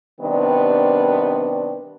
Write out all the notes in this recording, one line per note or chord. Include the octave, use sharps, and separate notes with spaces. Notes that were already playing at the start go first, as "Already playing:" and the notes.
C3 D#3 G3 B3 D4